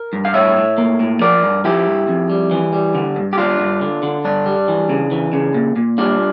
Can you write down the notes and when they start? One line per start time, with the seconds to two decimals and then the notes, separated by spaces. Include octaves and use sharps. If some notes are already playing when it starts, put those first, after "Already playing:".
Already playing: A#4
0.13 G2
0.25 F5
0.34 A2 C#5 E5
0.56 A2
0.78 A#3
1.00 A2
1.21 F3 A#4 D5
1.43 G2
1.64 F3 E4 G4
1.87 G2
2.08 F2
2.30 G3
2.51 E3
2.73 G3
2.95 D3
3.16 G2
3.33 G4
3.38 G2 D4 F4
3.60 G2
3.81 D3
4.03 D3
4.25 G2 D4
4.46 G3
4.68 E3
4.89 C#3
5.11 E3
5.33 C#3
5.54 A#2
5.76 A#2
5.98 G3 D4 F4